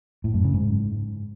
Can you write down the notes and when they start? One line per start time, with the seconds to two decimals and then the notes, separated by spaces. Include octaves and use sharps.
0.24 A2
0.34 F#2
0.44 C#3
0.54 G#2